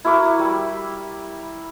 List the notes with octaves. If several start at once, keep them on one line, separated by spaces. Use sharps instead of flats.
E4 F#4 A#4 D6
G3